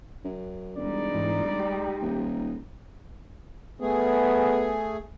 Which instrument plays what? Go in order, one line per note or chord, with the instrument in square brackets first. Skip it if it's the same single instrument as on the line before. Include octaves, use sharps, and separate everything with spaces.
[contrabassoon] F#2
[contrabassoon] E1 [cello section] G3 G#3 D#4 [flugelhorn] D5
[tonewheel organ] G#2 E3
G4
[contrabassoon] D#1
[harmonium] A3 G#4 [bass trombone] B3